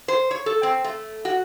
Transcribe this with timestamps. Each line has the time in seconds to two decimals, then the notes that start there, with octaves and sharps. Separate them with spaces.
0.08 C5
0.31 C#5
0.46 A4
0.63 C4
0.84 A3
1.25 F#4